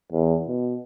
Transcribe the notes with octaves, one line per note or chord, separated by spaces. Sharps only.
E2
B2